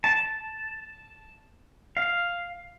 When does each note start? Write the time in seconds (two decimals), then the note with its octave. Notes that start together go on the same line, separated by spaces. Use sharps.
0.04 A5
1.97 F5